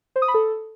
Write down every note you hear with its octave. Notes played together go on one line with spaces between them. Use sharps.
C5
D#6
B5
A4